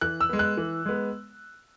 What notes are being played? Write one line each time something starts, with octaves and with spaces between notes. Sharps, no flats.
E3 F#6
E6
G#3 B3
F#6
E3
G#3 B3